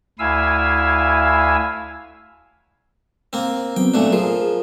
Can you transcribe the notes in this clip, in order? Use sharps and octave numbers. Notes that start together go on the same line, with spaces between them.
D2 E4 F5 G#5 E6
A#3 C4
F#3 B3 C4 G5
A#2 A3 D4
F3 F4 G#4 A#4